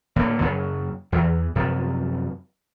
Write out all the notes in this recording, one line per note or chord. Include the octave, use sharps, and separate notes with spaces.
A2 D3 A#3
F#2 C#3 F#3
E2 E3
F#2 C3 F3